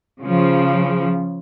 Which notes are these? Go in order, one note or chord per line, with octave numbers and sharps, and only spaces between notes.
C#3 F3